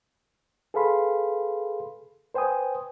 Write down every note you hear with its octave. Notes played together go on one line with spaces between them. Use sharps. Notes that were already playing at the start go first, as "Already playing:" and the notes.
G#4 A4 B4 F5 B5 C6
B4 C5 G5 G#5 D#6